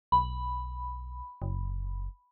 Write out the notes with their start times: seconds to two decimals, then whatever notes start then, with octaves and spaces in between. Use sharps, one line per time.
0.12 B1 B5
1.42 F#1